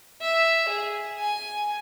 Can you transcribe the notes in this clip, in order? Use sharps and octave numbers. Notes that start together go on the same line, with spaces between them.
E5
G#4
G#5